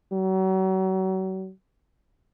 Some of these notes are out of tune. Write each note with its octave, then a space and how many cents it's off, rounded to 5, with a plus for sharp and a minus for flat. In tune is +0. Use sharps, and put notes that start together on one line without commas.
F#3 +35